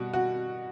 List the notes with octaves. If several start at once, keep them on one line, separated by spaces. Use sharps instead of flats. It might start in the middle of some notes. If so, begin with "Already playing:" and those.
Already playing: B2 G3 F#4
F#4